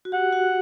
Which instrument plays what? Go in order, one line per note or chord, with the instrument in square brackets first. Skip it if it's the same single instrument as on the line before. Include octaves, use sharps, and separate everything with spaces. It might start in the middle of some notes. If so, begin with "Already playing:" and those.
[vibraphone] F#4
[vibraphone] G4 [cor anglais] F#5
[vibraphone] F#4